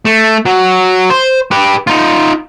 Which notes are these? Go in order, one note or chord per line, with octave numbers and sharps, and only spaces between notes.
A3
F#3
C5
G4 B4
D#4 F4